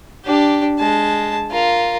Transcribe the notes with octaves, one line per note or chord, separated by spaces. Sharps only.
D4 G4
G#3 A5
F4 A#4